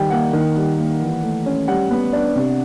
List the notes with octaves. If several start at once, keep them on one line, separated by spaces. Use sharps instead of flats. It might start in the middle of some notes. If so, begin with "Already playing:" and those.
Already playing: D#3 G3 G5
A#3 F#5
D#3
G3
A#3
E3
A3
C#4
G3 F#5
B3
D4
C3